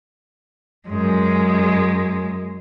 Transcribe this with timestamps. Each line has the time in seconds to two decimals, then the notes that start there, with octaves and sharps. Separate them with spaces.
0.89 F#2 G#3